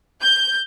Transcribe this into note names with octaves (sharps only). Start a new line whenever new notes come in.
G6